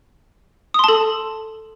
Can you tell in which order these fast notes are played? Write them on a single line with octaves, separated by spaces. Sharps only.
D#6 C6 A5 A4